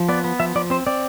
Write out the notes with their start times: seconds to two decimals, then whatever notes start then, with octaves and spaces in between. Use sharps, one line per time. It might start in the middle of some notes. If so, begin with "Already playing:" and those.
Already playing: F3
0.09 B3 D5
0.24 B3
0.40 F3 E5
0.55 F3 D5
0.70 C4 C5
0.87 C4 D5